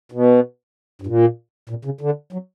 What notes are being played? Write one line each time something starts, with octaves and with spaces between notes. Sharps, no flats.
B2
G2
A#2
A#2
C#3
D3
F#3